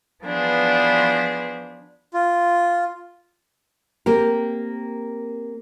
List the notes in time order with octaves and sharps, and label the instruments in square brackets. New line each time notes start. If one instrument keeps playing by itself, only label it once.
[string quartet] E3 F3 B3 D4 G#4 C5
[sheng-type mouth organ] F4
[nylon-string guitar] A#3 C4 G4 A#4